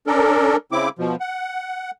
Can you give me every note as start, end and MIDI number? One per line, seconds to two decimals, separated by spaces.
0.07 0.56 61
0.07 0.56 62
0.07 0.56 69
0.07 0.56 70
0.72 0.89 49
0.72 0.89 60
0.72 0.89 64
0.72 0.89 86
0.99 1.16 47
0.99 1.16 53
1.20 1.91 78